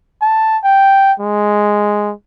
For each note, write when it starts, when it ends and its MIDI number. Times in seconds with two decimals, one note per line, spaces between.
0.22 0.58 81
0.64 1.13 79
1.20 2.12 56